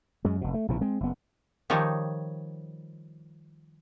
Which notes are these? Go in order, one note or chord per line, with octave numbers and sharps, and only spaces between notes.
F#2 G#3
F1 B2
A3
A#1 C3 E3
G#3 C4
F#1 B3
D#3 F3 G3 D#4 C#5